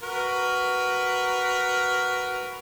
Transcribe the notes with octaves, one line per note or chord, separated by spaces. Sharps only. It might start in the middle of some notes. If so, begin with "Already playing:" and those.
F#4 A#4 B4